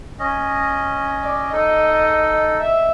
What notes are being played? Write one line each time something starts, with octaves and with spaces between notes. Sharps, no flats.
C#4 D#5
D5
D#4 A4 D#5
E5